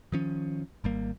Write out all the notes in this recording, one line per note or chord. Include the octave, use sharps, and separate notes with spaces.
D#3 F3 C#4
G#1 G3 A#3